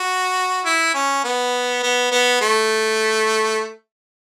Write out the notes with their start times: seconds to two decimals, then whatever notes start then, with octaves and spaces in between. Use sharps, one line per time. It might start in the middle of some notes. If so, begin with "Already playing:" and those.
Already playing: F#4
0.65 E4
0.94 C#4
1.24 B3
1.83 B3
2.12 B3
2.41 A3